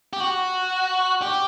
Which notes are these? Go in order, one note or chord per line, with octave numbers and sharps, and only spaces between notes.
G4
F#4
G4